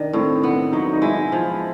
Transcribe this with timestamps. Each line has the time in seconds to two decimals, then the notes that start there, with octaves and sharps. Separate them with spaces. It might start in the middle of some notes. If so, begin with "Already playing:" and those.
Already playing: D#3 D4
0.13 A2 C4
0.44 B3
0.72 F#3 D#4
0.93 D#4
1.02 G#3 E4
1.32 F3